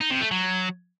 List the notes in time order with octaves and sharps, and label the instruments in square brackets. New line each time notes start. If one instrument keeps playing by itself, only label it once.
[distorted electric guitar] D#4
C3
A3
F#3